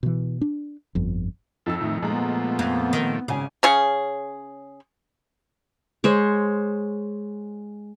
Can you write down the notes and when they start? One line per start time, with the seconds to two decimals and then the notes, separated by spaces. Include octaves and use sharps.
0.03 B2 E3
0.41 D4
0.95 G1 F2
1.66 F2 D#4 A4 E6
1.81 A2 D#3 A3
2.02 A#2 F3 G#3 A3 B3 A#5
2.59 F2
2.93 D#3
3.28 G#1 C#3 C#4 G#5
3.63 C#3 C#4 G#4
6.04 G#3 C5 C#5